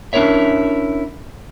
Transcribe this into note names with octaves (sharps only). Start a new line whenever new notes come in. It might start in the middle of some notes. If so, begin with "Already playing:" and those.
C#4 D4 E4 A#4 C#5 E5